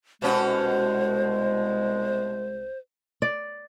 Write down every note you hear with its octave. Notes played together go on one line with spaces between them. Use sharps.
C2 B2 G#3 C#4 F#4 C5
D5